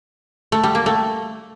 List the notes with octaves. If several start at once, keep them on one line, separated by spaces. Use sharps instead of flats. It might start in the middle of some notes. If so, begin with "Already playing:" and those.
A3
G3
A#3
A3